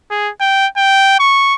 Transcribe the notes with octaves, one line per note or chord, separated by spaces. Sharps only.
G#4
G5
G5
C#6